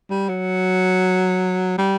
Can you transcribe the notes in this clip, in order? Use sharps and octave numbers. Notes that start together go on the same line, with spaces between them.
G3
F#3
G3